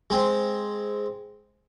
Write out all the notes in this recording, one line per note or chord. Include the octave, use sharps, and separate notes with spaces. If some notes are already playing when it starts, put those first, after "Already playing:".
G#3 C4